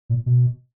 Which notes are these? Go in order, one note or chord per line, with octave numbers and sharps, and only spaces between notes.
A#2
B2